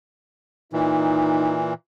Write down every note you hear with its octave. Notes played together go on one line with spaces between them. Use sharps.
A#2 E3 D#4